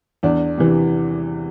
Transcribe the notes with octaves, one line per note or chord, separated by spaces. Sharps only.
E2 D4
C3 E3